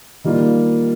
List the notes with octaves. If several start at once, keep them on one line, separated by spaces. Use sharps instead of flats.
D#3 G3 A#3 F4